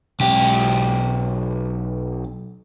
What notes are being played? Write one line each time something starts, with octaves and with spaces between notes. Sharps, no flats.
B1 G4